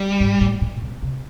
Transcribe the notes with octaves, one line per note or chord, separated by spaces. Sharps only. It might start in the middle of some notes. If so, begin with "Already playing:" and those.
Already playing: G3
G#2
A2
A#2
B2
C3